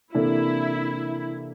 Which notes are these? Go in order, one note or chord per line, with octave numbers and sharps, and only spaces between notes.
C3 E3 A#3 D4 E4 A4